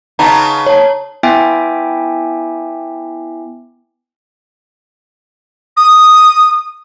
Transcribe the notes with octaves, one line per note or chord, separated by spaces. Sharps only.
C#3 B3 D#4 A5 A#5
C#5 A5
B3 E4 E5 G5 G#5 D6
D#6